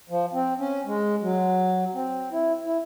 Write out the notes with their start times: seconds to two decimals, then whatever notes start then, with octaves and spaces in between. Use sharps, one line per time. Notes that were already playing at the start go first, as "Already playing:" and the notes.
0.10 F3
0.33 C4
0.59 C#4
0.86 G#3
1.22 F#3
1.95 C4
2.32 E4
2.65 E4